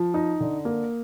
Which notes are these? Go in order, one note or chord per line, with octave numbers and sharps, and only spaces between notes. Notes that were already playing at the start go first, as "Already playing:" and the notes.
Already playing: F3
D#4
D3
A#3